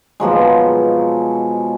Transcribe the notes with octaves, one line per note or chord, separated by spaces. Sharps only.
B2 F3 F#3 G#3